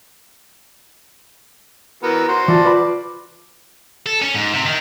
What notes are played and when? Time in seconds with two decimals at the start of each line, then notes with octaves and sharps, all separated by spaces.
2.03 E3 B3 F#4 A#4
2.28 F#4 C5
2.48 E3 F4 D5 A5 B5
2.65 B4 D5 B5 D6
4.06 A4
4.22 C#4
4.34 G#2
4.54 C3
4.66 D#3